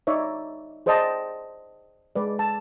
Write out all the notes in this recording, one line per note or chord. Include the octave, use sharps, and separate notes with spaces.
D#4 C#5 D5 E5
G#4 C5 D5 D#5 G5 A5
G#3 B4 D5
A5